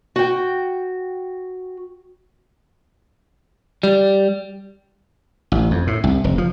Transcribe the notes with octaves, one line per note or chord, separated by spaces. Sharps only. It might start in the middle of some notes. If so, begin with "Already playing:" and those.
F#4 G5
G3
A1
F2
A2
C2
F1
F3